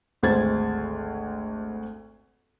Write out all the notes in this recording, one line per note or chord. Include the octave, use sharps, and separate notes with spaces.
G#1 D2 G#3 C5 G#6 A6